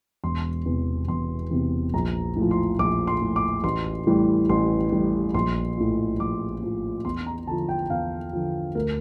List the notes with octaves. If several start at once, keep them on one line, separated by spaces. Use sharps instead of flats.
E1 C6
E2 C3
E1 C6
E2 C3
A#1 A#5
A2 F3
C6
A#1 D6
C6
A2 F3
D6
A1 C6
A2 E3 G3
A1 C6
A2 E3 G3
A#1 C6
A2 F3
A#1 D6
A2 F3
E2 C6
A#5
D3 F3 A5
G5
E2 F5
D3 F3
D2 A#4